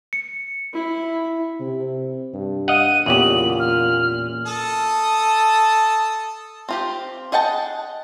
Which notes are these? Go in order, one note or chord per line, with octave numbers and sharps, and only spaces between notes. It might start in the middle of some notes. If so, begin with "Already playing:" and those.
C#7
E4
C3
G2
D#5 F5 F#5 D#7
E2 A#2 C#3 G4 F#7
F6
A4 A5 D#6
C4 F4 G4
G#4 D#5 F#5 G5 A5